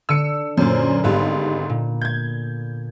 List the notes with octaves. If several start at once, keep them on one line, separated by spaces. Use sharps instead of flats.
D3 E6 C#7 D#7
F#2 A#2 C5 D5
G#1 G#2 G3 A3 B3
A#2
G6 G#6